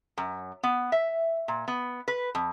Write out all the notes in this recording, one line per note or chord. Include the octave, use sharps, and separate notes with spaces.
F#2
B3
E5
A#2
B3
B4
F2